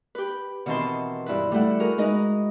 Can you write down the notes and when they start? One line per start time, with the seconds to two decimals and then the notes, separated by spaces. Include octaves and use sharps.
0.15 G4 B4
0.66 B2 D#3 E3 C4 A5 C6
1.26 G2 E4 B4
1.51 G3 A3 E4 F#5
1.80 F#4 G#4 A#4
1.98 G#3 D#4 B4 D#5